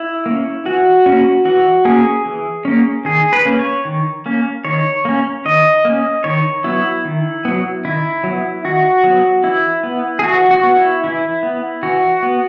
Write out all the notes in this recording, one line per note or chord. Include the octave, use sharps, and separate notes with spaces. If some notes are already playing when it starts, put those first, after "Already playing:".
Already playing: E4
A#3
C#4
E3 F#4
A#3 C#4
E3 F#4
A#3 C#4 G#4
E3
A#3 C#4
D#3 G#4
B4
A#3 C#4
C#5
D#3
A#3 C#4
D#3 C#5
A#3 C#4
D#3 D#5
A#3 C#4
D#3 C#5
F#3 B3 E4
D#3
F#3 B3
D#3 E4
F#3 B3
D#3 F#4
F#3 B3
E3 E4
B3
G#4
E3 F#4
F#4
B3
E4
E3 E4
B3
E3 F#4
B3